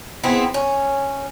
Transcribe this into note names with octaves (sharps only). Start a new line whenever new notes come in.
B3 C4 E4 G#4
C#4